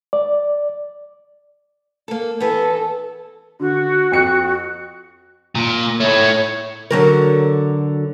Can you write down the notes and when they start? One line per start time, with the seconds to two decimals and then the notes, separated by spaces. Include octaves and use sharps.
0.13 D5
2.08 A#3 A4
2.40 E3 B3 A4
3.60 D3 F#4
4.12 F2 C#7
5.55 A#2
6.00 A3 E4 C#5
6.91 D3 F#3 A#4